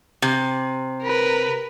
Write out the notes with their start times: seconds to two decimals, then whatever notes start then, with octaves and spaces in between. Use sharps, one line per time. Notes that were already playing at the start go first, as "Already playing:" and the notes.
0.22 C3
1.02 A#4 B4